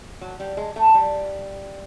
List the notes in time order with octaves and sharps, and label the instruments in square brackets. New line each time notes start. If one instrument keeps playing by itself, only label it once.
[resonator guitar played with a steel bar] F#3
G3
G#3
A3
G3